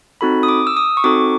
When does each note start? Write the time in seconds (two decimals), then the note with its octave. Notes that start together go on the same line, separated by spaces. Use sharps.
0.21 C4 D#4 F#4 A4 B5
0.43 D#6
0.48 D6
0.67 E6
0.77 D#6
0.97 C#6
1.04 C4 D#4 F#4 A4 D6